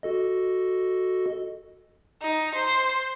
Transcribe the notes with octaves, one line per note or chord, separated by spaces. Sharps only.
F#4 A4 D#5
D#4
C5